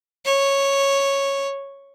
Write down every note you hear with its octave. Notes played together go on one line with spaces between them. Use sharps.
C#5